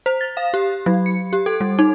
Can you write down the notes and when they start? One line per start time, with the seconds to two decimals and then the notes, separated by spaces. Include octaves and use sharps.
0.06 C5
0.21 A6
0.37 F5
0.54 G4
0.86 F#3
1.06 C#7
1.33 G4
1.46 A4
1.61 G3
1.79 D#4